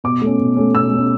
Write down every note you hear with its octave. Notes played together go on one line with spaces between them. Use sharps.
B2 D6
A3 C#4
B2
A3 C#4
B2 E6
A3 C#4